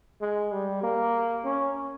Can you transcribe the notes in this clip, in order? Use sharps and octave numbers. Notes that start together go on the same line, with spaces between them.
G#3
G3
A#3
C#4